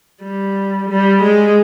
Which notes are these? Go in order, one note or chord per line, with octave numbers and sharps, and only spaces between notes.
G3
G3
G#3